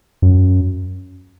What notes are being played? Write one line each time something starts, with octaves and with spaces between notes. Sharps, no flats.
F#2